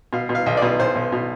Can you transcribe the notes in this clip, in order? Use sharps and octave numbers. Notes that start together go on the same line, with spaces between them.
B2 F5
B2
F5
B1
D5
B2
B1 C5
B1
B2